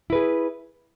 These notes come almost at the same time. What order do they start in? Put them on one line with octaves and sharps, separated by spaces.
E4 B4 G#4